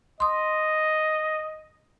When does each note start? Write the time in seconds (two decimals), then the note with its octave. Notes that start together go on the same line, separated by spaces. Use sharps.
0.20 D#5 C6 D#6